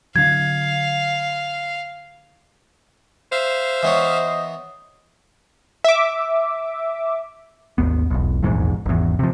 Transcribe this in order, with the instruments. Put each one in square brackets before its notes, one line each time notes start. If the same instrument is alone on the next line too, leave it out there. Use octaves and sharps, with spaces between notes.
[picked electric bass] D3 F#3 [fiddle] F5 [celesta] G#6
[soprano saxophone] C5 [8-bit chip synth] E5 F5
[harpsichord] E3 B3 C#5 [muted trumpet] D#5
[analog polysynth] E5 D6
[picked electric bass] G#1 D#2 B3
E1 B1
D#1 A#1 E2 G#2
G#1 E2
C3 F3